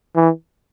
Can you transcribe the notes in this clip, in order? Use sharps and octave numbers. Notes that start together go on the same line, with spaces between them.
E3